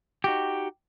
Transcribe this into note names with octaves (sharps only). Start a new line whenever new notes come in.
D#4 F#4 G4